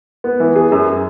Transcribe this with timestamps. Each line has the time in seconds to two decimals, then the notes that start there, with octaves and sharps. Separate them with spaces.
0.24 B3
0.40 E3
0.56 G#4
0.72 F#2